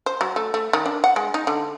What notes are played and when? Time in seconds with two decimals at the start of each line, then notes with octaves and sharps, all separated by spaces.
0.06 C5
0.21 F#3
0.36 A3
0.54 A3
0.73 D#3
0.86 D4
1.04 F#5
1.16 G#3
1.34 D#4
1.47 D3